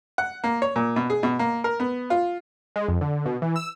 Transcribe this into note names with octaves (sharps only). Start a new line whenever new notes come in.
F#5
A#3
C#5
A#2
B2
G#4
B2
A#3
A#4
B3
F4
G#3
F2
D3
B2
E3
E6